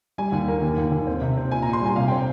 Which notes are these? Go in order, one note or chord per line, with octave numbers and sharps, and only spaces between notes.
G3 G#5
D#2
A#3
D#2
D#2
D#2
C4
C3
C4
A#2 G#5
A#2 A#5
C6
G3 G#5
C3 F5
C4 G5